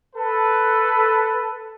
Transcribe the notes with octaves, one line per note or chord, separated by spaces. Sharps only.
A4 B4